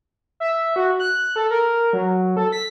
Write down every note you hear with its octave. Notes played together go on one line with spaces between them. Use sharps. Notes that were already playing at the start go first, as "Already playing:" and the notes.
E5
F#4
F#6
A4
A#4
F#3
A4
B6